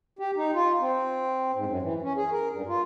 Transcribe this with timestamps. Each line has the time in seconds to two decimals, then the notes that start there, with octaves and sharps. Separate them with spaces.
0.19 G4
0.36 D#4
0.54 F4
0.80 C4
1.54 G#2
1.66 F#2
1.82 E3
2.02 C#4
2.17 G#4
2.31 A#4
2.51 G2
2.68 F4